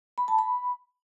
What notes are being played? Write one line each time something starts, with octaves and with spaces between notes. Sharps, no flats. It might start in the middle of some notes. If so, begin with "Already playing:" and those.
B5
A5
B5